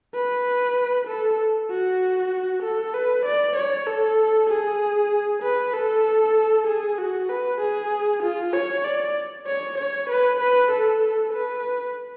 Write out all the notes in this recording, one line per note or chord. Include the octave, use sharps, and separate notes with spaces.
B4
A4
F#4
A4
B4
D5
C#5
A4
G#4
B4
A4
G#4
F#4
B4
G#4
F4
C#5
D5
C#5
C#5
B4
B4
A4
B4